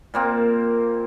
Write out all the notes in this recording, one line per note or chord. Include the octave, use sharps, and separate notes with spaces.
A#2 A#3 C4